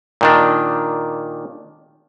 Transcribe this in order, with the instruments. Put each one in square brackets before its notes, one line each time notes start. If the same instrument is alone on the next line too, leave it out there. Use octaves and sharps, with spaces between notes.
[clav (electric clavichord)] A#2 D#3 D4